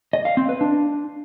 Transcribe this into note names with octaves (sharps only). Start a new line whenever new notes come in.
D#5
F5
C4
B4
D4